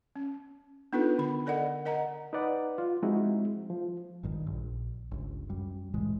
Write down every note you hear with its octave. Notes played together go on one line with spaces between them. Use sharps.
C#4
B3 D4 D#4 F4 A4 B4
D3 B5
A4 A#4 D5 D#5 F#5
A#4 D#5 F#5 A#5
D#4 B4 D5 F#5
F4
F3 G#3 C4 D#4 E4 F#4
F3
G#1 G2 D#3
A#1
G1 C#2
F#2 G3
C2 A2 E3 G#3